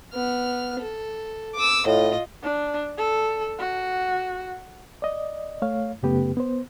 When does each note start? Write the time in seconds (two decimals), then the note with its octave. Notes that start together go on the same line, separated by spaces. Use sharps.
0.14 B3 F6
0.79 A4
1.55 D6 E6
1.86 A2 F4 D#5
2.43 D4
2.97 A4
3.58 F#4
5.02 D5 D#5
5.62 A3 C#5 F5
6.03 F#2 C#3 A3 B3 G4 B4
6.37 B3 C5